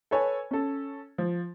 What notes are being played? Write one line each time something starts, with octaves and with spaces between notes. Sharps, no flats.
A4 B4 C#5 G#5
C#4 A4
F3